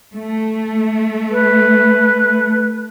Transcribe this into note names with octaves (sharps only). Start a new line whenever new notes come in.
A3
B4